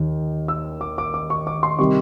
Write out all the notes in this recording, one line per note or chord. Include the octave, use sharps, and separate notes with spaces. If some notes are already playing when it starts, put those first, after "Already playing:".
Already playing: D#2 D#3
E6
D6
D6
D6
C#6
D6
C6
C3 D#3 G3 C#6